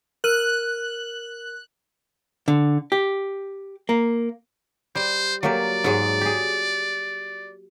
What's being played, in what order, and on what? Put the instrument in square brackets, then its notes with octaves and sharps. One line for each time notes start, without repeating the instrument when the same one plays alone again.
[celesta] A#4 F6 D#7 [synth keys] F#6
[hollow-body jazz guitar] D3
G4
A#3
[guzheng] G3 [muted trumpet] C5
[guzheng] F#3 A#3 G4 [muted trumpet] D5
[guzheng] G#2 F#3 G#3
G4 G#4